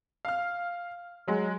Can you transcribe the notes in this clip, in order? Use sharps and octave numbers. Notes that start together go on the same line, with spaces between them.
F5 F6
F#3 G#3